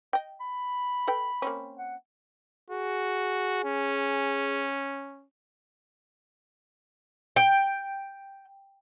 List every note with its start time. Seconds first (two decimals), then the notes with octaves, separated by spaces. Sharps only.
0.13 D#5 G5
0.40 B5
1.07 A4 B4 G5
1.42 A#3 C4 C#4
1.78 F#5
2.70 F#4 G#4
3.65 C#4
7.36 G5